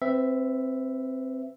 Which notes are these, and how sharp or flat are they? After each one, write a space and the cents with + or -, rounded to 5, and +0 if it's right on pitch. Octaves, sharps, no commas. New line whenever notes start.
C4 +0 B4 +25 E5 +0